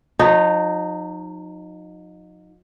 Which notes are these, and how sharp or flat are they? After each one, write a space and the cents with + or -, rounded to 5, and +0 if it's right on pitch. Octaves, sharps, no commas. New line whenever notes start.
F3 +45 D#4 -10